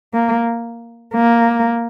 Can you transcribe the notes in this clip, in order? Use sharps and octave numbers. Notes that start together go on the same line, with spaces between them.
A#3
A#3